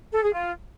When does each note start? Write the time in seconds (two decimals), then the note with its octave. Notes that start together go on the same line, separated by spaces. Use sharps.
0.12 A4
0.23 G#4
0.33 F4